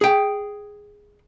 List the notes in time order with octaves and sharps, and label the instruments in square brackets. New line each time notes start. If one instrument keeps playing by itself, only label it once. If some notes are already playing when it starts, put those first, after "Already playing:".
[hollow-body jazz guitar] G#4 G5